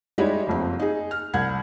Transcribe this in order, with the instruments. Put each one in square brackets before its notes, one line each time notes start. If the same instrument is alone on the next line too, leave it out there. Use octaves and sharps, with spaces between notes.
[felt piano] G3 G#3 D#4 E4 C#5 D5
F#1 F2 C4
D#4 G#4
F6
C2 F#5 G#6